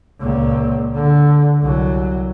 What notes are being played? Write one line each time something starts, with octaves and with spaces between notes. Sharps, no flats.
C#2 A#2
D3
C2 F#3